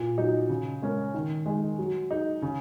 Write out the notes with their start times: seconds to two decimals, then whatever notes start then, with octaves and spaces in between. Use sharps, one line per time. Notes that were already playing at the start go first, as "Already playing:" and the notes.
Already playing: A#2
0.17 F#3 D#4
0.49 C#3
0.82 G#3 C#4 A#4
1.14 D#3
1.46 G#3 D#4 G#4
1.78 F#3
2.10 D#4 G#4
2.42 C#3